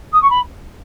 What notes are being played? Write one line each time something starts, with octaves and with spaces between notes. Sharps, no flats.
D#6
C#6
B5